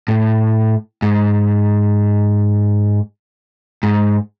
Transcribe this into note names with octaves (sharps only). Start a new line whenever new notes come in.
A2
G#2
G#2